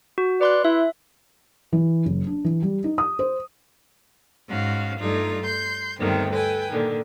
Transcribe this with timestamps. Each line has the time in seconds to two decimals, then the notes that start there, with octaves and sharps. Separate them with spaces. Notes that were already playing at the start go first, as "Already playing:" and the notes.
0.18 F#4
0.41 B4 D5 C6 F#6
0.65 E4 E5
1.72 E3
2.06 F#1
2.27 D4
2.44 E3
2.62 G3
2.84 D#4
2.98 D#6
3.19 C5
4.48 G#2 C#4 F#4 F5
4.99 G2 G3 A3 D#4 F4
5.45 C6 G6
5.99 D2 G2 C3 D#3 A3 B3
6.32 A4 B4 G5 G#5
6.70 A#2 D3 D#3